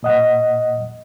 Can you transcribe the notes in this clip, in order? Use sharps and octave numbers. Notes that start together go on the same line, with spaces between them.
A#2 D#5 F#5